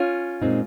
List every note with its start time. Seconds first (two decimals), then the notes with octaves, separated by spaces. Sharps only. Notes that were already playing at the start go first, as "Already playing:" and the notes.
Already playing: C#4 F4
0.42 A#2 G#3 C4 D#4